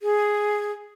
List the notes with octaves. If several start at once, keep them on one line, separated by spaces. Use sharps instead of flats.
G#4